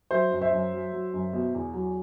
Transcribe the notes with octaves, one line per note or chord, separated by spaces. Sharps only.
F#3 C5 E5
F#2
C5 E5
F#2
F#3
F#3
F#2
B2
E2
F#3